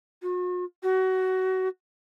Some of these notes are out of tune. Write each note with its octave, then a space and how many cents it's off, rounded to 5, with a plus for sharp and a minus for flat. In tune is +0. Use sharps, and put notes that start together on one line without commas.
F#4 -45
F#4 +25